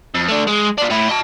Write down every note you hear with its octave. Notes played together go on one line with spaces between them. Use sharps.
F2
A3 D4
G#3
D4 F4
A2 E4
D#5 A5